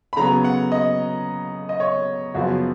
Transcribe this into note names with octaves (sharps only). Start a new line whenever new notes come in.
B5
C#3 F#3 B3 A#5
F#5
D#5
D#5
C#5
F#2 C#3 F3 B3 F#4